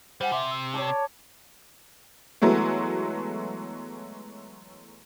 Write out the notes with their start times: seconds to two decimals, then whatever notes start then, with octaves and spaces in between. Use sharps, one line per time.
0.21 G3 C5 F#5 G#5
0.32 C3 E5 C6 D6
0.51 E6
0.74 C#5 D5 A5
2.42 E3 F#3 G#3 A3 B3